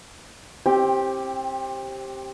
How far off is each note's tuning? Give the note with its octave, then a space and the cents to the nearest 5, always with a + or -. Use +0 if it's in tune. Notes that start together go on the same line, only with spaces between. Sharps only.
C4 +25 G4 +0